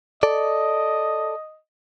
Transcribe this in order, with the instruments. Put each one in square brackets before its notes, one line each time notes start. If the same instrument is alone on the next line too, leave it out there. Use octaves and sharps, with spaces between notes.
[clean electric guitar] A4 D5 [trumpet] D#5